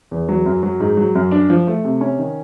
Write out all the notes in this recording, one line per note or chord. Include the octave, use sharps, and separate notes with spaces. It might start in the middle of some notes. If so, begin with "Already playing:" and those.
E2
F#3
F#2
F#3
G#2
F#3
F#2
D4
F3
A3
C3
C#4
D#3